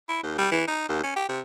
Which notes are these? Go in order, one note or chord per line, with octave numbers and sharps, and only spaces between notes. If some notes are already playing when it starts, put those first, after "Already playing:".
E4
D#2
G3
E3
D#4
D#2
C#4
G4
C3